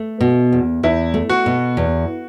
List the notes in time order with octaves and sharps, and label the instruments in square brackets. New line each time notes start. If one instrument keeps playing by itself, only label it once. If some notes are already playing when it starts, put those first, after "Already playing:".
Already playing: [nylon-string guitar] A3
B2
E2
[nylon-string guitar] E2 [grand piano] E4
[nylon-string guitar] A3
[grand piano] F#4
[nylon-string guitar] B2
E2